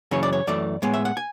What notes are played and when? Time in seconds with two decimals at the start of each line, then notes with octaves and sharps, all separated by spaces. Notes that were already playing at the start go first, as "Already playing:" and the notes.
0.11 F#2 C#3 E3 C#5
0.23 D5
0.33 C#5
0.47 F#2 E3 A3 D5
0.82 A2 G#3 B3
0.94 E5
1.05 F#5
1.17 G#5